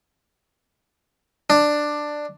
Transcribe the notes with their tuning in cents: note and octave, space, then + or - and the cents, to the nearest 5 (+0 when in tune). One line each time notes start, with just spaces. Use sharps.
D4 +10